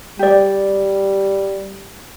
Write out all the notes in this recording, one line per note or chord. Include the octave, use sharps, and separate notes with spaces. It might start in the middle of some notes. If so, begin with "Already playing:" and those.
G3 G4 D5